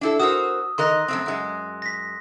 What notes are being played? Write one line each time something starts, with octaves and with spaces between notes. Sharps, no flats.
D4 E4 A4
F#4 A#4 C5 D#6 E6
D#3 A#4 D#5 C6 F#6 A#6
F#2 A3 C4
F#2 G#3
A#6 B6